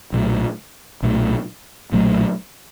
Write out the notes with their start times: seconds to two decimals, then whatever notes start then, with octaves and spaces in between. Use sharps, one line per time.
0.12 B1 A#2 F#3 A3
1.03 B1 A#2 F#3 A3
1.92 B1 A#2 F#3 A3